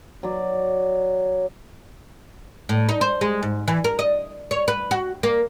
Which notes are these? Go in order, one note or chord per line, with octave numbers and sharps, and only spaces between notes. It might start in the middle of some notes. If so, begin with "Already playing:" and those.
F#3 D5
A2
D#4
C5
G#3
G#2
E3
A#4
D#5
C#5
B4
F#4
A#3